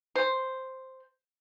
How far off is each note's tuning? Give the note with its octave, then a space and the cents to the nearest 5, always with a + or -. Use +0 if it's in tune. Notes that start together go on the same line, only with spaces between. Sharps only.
C5 +0